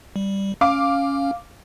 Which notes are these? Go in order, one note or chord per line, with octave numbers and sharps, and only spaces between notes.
G3
C#4 F5 D6